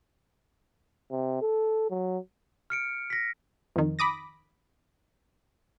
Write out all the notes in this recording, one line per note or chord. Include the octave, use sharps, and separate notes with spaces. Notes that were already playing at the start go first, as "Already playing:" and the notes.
C3
A4
F#3
F6 C#7 D7
A#6 B6
F2 D#3
B5 D6 D#6 A#6